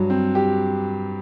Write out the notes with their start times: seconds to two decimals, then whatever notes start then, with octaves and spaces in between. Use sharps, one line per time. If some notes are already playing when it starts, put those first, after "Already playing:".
Already playing: G2 F#3
0.10 C4
0.35 G4